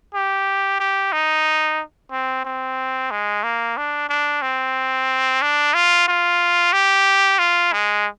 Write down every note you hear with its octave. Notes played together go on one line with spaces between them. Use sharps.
G4
G4
D#4
C4
C4
G#3
A#3
D4
D4
C4
D4
F4
F4
G4
F4
G#3